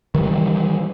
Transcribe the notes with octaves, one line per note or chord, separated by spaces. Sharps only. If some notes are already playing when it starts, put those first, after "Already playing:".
D#3 E3 G3